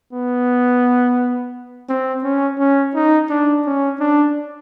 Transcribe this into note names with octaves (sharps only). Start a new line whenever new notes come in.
B3
C4
C#4
C#4
D#4
D4
C#4
D4